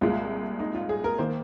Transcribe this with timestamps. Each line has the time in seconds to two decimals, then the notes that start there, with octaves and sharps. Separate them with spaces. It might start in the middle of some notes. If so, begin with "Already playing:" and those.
0.01 C2 A#2 G#3 F4
0.59 D#4
0.75 F4
0.89 G#4
1.04 A#4
1.18 D#3 A#3 C5